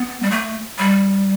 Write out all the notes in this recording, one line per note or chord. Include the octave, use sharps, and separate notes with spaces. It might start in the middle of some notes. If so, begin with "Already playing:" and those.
Already playing: B3
G3
A3
G3